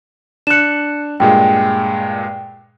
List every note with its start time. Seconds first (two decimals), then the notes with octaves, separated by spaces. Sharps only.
0.47 D4 F#6 C#7 E7
1.20 G2 A#2 G#3 G5